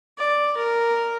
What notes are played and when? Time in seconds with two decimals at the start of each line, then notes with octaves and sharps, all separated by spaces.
0.18 D5
0.57 A#4